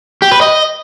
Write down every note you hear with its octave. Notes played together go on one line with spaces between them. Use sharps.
G4
B4
D#5